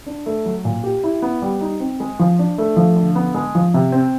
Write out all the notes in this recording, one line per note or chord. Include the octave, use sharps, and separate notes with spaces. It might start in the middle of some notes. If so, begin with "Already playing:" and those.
D4
A3
F#3
A#2
G4
E4
B3
G3
D#4
C4
G#3
F3
D4
A3
F3
D3
B3
G#3
F3
C3
C4